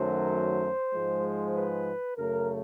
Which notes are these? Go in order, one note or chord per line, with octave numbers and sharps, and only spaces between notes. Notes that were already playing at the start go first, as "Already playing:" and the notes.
Already playing: F#2 D#3 F#3 A3 C5
G#2 F3 G#3
B4
F#2 C#3 F#3 A3 A#4